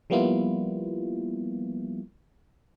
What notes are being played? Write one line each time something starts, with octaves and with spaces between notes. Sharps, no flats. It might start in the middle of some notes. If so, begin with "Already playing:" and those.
F3 G3 A#3 B3 E4 F4